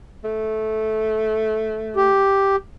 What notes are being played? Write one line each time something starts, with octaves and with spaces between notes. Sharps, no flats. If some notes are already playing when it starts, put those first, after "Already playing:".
A3
G4